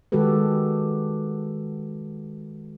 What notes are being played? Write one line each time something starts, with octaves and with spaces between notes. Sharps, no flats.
D#3 G#3 F#4 G4 A4 B4